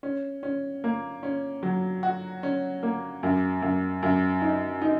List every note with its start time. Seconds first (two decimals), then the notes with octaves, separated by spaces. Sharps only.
0.03 C#4
0.43 C#4
0.84 A#3
1.23 C#4
1.63 F#3
2.03 F#4
2.43 C#4
2.83 A#3
3.23 F#2
3.62 F#2
4.03 F#2
4.42 D#4
4.82 D#4